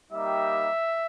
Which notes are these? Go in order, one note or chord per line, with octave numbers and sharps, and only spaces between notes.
G3 A#3 D#4 G4 E5